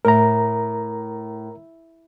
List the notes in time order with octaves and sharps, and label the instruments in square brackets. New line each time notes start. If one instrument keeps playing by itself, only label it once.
[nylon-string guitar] A2 [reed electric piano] A#4 A#5